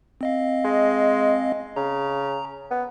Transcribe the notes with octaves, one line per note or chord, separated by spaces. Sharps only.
C4 D#5 F5
G#3
C#3 A#5
B3